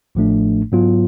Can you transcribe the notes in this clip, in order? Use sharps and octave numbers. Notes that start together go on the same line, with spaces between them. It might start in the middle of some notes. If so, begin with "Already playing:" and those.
A1 A2 F3 A3 D4
G#2 F#3 B3 F4